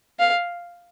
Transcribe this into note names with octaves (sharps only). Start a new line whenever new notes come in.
F5